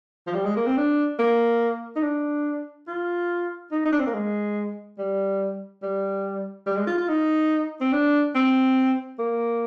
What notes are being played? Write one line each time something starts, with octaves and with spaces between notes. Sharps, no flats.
F3
G3
G#3
A#3
C4
D4
A#3
D#4
D4
F4
D#4
D#4
D4
C4
A#3
G#3
G3
G3
G3
G#3
F4
F4
D#4
C4
D4
C4
A#3